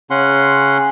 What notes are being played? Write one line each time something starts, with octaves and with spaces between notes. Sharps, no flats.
C#3 C#4 F#5 C6